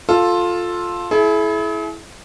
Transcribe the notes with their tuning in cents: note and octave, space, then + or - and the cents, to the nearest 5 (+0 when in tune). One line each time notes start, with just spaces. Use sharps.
F4 +10 A4 +0
E4 +0 G#4 +45